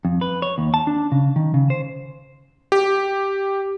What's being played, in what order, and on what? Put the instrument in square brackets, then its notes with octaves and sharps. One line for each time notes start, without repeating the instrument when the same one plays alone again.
[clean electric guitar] F2
B4
C#5
D#2
A5
D4
C#3
D#3
C#3
C5
[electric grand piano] G4